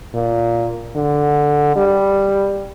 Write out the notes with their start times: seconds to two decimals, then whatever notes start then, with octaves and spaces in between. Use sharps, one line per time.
0.14 A#2
0.96 D3
1.76 G3